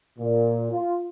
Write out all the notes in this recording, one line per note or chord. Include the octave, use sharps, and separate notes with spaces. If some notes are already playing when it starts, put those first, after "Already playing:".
A#2
F4